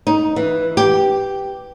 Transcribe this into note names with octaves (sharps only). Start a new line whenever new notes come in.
D#4
E3
G4